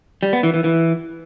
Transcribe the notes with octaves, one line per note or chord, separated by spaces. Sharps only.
G3
B3
E3
E3
E3